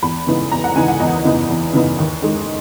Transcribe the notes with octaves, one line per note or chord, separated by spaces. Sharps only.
E2 B5
C#3 E3 B3 D#4
E2 A#5
F#5
C#3 E3 B3 D#4 G#5
F#5
E2 D#5
C#3 E3 B3 D#4
E2
C#3 E3 B3 D#4
D#2
D#3 G#3 D#4